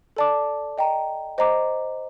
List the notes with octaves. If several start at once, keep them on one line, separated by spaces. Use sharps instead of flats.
A4 D5 A5 D6
D#5 G5 A#5
C5 D#5 A#5 D6